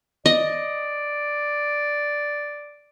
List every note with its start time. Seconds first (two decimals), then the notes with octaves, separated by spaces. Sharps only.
0.26 D5 D#5